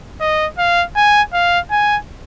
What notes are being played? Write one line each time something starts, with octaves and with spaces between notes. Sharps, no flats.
D#5
F5
G#5
F5
G#5